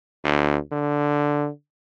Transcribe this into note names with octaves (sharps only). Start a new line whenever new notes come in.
D2
D3